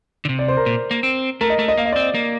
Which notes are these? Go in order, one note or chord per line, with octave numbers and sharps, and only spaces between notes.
D3
C3
D5
C5
A#4
A#2
A#3
C4
A3 A#4
D#5
A3
D#5
A#3 F5
D#5
D5
C4 D#5
A#3